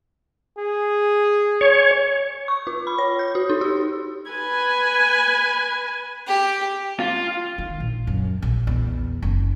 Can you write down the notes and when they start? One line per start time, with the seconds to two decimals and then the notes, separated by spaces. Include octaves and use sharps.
0.58 G#4
1.61 C#5
2.48 C#6
2.67 F4
2.87 B5
2.98 C#5
3.19 G6
3.35 F#4
3.50 D#4
3.61 G4
4.31 B4 G#5
6.27 G4
7.00 F4
7.58 D#3
7.80 A#1
8.07 F#2
8.42 A#1
8.67 E2
9.22 F#1